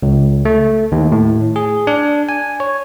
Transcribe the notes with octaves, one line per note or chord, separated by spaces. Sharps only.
C#2
A3
D#2
A2
G#4
D4
G#5
C#5